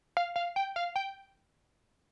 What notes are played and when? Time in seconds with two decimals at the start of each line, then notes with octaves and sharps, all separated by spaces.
0.17 F5
0.36 F5
0.56 G5
0.76 F5
0.96 G5